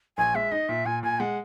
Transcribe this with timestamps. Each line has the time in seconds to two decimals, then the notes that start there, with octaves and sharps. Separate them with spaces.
0.18 A#1 G#5
0.35 G#3 E5
0.52 D#4 D#5
0.69 A#2 E5
0.85 A#2 G#5
1.03 A#2 G#5
1.20 G#3 F#5